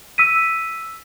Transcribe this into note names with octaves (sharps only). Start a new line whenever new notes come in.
E6 B6 D#7